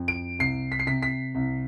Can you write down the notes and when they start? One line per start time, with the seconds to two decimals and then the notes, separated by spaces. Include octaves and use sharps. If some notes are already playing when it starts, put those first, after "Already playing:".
Already playing: F2
0.08 D7
0.39 C2 C7
0.72 B6
0.79 C7
0.87 C3 B6
1.02 B6
1.35 C2